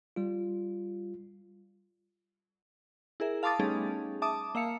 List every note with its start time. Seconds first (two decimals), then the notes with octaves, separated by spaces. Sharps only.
0.16 G3 F4
3.20 E4 G#4 A#4 E5
3.43 F5 A5 C6 D6 D#6 A6
3.59 G3 A3 B3 C#4 D#4 G#4
4.22 E5 A5 D6 D#6
4.55 A#3 E5 F5 C#7